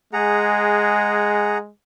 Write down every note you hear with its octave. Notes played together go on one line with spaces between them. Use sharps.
G#3 G#4 F#5 A#5